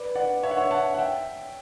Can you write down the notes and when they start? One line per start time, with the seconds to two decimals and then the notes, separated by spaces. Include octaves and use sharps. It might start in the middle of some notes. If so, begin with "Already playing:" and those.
Already playing: B4 D5
0.15 D5 F#5
0.43 C#5 E5
0.51 F#5
0.57 C#5 E5
0.71 F#5 A5
0.94 F#5
0.98 E5 G5